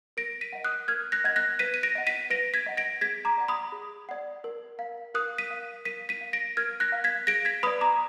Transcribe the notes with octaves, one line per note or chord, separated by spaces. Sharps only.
A#4 A#6 D7
B6 D#7
D#5 F#5
D#6 F#6
A#4 F6 G#6
F#6 A#6
D#5 F#5 G#6
F#6 A#6
B4 B6 D#7
D#7
A#6 D7
D#5 F#5
B6 D#7
B4 A#6 D7
G#6 B6
D#5 F#5
A#6 D7
G#4 G#6 B6
A#5 D6
D5 F#5
B5 D#6
G#4
D5 F#5
A#4
F5
A#4 D#6 F#6
B6 D#7
F5
A#4 B6 D#7
B6 D#7
F5
A#6 D7
A#4 F6 G#6
F#6 A#6
F5
G#6 B6
G#4 A#6 D7
G#6 B6
B4 D5 B5 D#6
A#5 D6